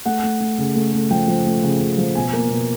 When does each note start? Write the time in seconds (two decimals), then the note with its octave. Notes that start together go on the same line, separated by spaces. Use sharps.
0.06 A3 F#5
0.23 A3
0.41 A3
0.58 C#3
0.76 A3
0.93 A3
1.11 F3 G5
1.28 F3
1.45 A3
1.63 C#3
1.80 C#3
1.98 F3
2.15 B2 G#5
2.33 A#3
2.50 B2